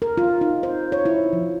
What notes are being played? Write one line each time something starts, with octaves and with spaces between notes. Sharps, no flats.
A#4
F4
D#4
C5
C#5
E4
F3